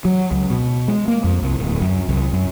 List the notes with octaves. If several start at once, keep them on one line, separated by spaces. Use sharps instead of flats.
F#3
C#2
B2
G#3
A#3
F2
C2
D1
F#2
C2
F#2